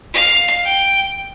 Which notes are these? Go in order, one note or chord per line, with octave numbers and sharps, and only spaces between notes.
F5
G5